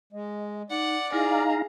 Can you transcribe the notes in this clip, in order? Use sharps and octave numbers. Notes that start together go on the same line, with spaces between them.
G#3 D#5
D#4 D5 F#5
D#4 E4 G#4 F5 A#5